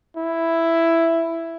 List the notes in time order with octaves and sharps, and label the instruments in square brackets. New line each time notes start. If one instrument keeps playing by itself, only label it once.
[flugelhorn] E4